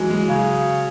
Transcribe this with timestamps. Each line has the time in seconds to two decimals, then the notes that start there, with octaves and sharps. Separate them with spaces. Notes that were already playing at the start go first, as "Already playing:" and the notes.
Already playing: E3 F#3 G#3
0.10 G#3
0.28 C#3 F#3